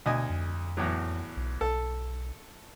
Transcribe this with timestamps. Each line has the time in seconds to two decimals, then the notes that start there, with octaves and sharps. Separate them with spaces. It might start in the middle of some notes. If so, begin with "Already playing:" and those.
0.06 D2 B2 D#5 G#5
0.29 F2
0.77 E2 A2 F#3
1.36 B1
1.61 B1 A4